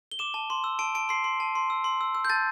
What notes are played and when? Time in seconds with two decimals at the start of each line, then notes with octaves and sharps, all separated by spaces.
0.11 G7
0.19 D6 E7
0.34 A5
0.50 C6
0.64 E6
0.79 A5 D7
0.95 A5 D7
1.09 C6 C7
1.24 C6
1.40 A5
1.55 C6
1.70 E6
1.84 C6
2.01 E6
2.15 E6
2.25 G6
2.30 A5 A6